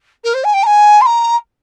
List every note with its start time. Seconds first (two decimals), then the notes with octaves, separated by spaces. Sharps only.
0.24 A#4
0.34 C5
0.44 G#5
0.53 G5
0.63 A#5
0.66 G#5
1.01 C6
1.06 A#5